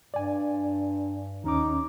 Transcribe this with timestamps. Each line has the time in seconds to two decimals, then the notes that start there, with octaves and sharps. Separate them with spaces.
0.14 G2 D5 G#5
1.44 D#2 C#4 D#4 D6